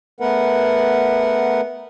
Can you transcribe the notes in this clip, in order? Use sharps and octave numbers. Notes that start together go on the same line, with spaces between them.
A3 B3 A#4 B4 F#5